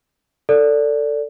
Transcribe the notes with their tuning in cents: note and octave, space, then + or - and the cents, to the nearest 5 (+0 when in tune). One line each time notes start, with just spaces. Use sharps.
A4 +20 D5 -10